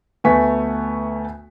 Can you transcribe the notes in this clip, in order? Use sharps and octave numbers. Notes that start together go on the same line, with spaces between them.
D2 A3 B3 G#5 C#6 B6